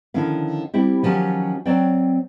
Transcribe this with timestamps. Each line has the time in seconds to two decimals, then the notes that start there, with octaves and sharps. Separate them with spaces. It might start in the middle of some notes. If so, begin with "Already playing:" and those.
0.14 D3 D#3 F3 C#4 E4 F5
0.73 G3 C4 E4 G4
1.03 D#3 F3 F#3 C#4 F#4 G4
1.66 F#3 C4 C#5 D5 G5